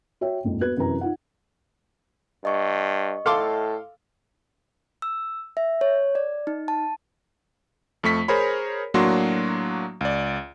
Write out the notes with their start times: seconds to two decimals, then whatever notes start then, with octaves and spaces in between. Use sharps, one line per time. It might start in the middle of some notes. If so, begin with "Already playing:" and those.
0.21 F#4 C#5 E5 G5
0.44 A#1 F2 G#2
0.61 B3 F#4 B4 F#6 G#6
0.77 F#2 C3 E3 B4 A#5
1.01 D#4 F4 F#5
2.45 G2 D#5 C#6
3.26 A2 A4 F5 C6 D6
5.02 E6
5.57 E5
5.81 C#5
6.15 D5
6.47 D#4
6.68 A5
8.04 F2 A3 C#6 B6
8.28 G#4 A#4 C5 C#5 B5
8.94 A2 F#3 A#3 D4 F#4 C6
10.01 C#2 D5